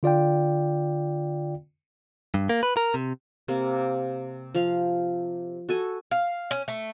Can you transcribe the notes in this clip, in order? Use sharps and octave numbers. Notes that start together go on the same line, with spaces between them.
D3 F4 D5 F5 G5
G2
A#3
B4
A#4
C3
C3 A#3
F3 F5
F#4 A4 G#5
F5
C#4
A3